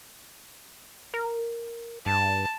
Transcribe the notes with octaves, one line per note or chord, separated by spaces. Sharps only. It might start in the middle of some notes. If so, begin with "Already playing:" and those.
A#4
G2 A5